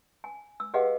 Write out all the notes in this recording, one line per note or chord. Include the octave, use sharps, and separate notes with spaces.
G#5
E6
G4 G#4 B4 D#5 F5 F#5